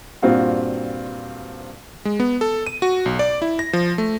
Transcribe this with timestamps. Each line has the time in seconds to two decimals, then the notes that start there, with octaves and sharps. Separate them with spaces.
0.22 G2 A#2 C4 F4 F#4
2.05 G#3
2.20 B3
2.41 A4
2.67 D#7
2.82 F#4
3.06 B1
3.19 D5
3.42 E4
3.59 A#6
3.73 F3
3.98 A3